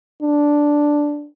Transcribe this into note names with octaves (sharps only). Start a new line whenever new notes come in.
D4